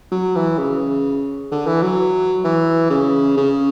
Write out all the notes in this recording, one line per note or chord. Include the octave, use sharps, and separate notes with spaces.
F#3
E3
C#3
D3
E3
F#3
E3
C#3
C#3